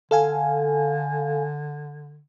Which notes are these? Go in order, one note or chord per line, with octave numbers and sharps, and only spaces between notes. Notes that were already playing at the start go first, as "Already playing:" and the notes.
D3 A4 F5 G#5